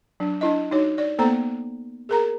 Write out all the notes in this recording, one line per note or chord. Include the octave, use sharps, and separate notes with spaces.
F#3 D4
D4 E4 D#5
D#4 F#4 C#5
D5
A#3 B3 A4 C5 A#5
G#4 A#4 A#5